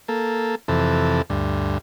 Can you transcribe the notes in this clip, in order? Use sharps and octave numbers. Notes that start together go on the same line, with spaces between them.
A#3 A4
F2 C3 E3 A4
D2 G2